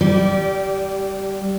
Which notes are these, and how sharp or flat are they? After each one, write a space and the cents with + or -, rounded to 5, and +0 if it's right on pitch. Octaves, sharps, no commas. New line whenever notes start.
G3 +0 G4 -20 D5 -25